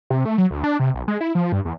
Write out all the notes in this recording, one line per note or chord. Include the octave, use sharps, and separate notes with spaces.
C3
A3
F#3
D2
D4
C3
B1
G#3
E4
F3
G2
E2